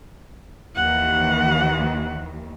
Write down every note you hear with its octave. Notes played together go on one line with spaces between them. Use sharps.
D#2 D#3 E3 F#5